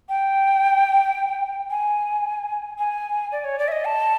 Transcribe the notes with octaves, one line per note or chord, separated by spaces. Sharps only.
G5
G#5
G#5
D5
C#5
D5
E5
D#5
A5